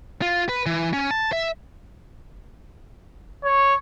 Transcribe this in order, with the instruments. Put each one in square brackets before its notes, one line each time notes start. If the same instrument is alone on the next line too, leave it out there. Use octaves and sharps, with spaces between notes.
[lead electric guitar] F4
B4
E3
C#4
A5
E5
[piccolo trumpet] C#5